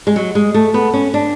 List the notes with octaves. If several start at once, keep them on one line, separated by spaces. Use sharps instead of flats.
G#3
F#3
G#3
A3
B3
C#4
D4